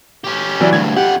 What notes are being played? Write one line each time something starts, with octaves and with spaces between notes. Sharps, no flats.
C#4 G4
E3 F#3 D5
D2 G2 G#6
F2 G4 F#5